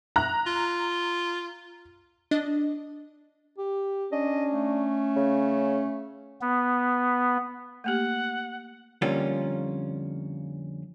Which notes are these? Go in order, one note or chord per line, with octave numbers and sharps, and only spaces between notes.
A#5 F#6
F4
D4 D#5
G4
C#4 D4 D#5
A3
C#3
B3
A3 A#3 G4 F#5
F2 D3 G3 A#3 C#4 F4